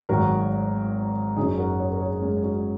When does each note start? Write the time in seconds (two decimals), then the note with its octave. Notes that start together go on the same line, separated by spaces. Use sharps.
0.09 G#1 G#2 D#3 F#3 F#4 A#4
1.37 F#1 F#2 F#3 D#4 G#4
1.58 F#4 A#4
1.79 G#4 C#5
1.91 A#4
2.01 G#4 C#5
2.22 G#3 C#4
2.43 C#4 F#4